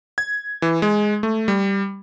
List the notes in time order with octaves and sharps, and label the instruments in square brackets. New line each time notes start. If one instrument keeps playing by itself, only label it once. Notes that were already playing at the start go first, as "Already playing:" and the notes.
[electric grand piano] G#6
E3
G#3
A3
G3